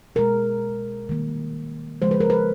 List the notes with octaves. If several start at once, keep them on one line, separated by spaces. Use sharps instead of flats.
B2 G#3 A#4
D#3 G3 A#3
C#3 F3 G#3 C5
B4
A#4
B4